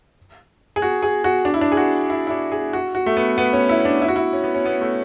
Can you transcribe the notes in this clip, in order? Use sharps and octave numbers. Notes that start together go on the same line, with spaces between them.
G#4
F#4
G#4
F#4
D4
E4
D4
G#4
F#4
E4
E4
D4
G#4
F#4
F#4
A3
B3
B3
C#4
E4
D4
E4
F#4
E4
C#4
B3
C#4
B3
A3